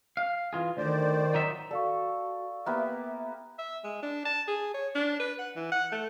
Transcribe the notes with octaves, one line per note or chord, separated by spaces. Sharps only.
F5
E3 F4 G#4
D2 D#3 C5 D5
F#3 D#4 E5
F#4 A4 D5 F5 C#6
A#3 B3 G4 E5
E5
G#3
D4
A5
G#4
C#5
D4
B4
F#5
E3
F#5
A3